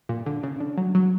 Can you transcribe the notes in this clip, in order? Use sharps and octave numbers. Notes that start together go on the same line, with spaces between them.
A#2
D3
C#3
D3
F#3
F#3